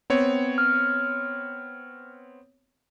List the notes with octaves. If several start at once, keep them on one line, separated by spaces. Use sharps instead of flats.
B3 C4 C#5
F6